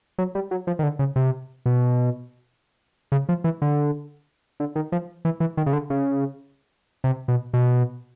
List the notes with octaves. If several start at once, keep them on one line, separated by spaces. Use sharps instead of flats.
F#3
G3
F#3
F3
D#3
D3
C#3
C3
B2
C#3
F3
E3
D3
D3
D#3
F3
E3
E3
D#3
C#3
D3
C#3
C3
B2
B2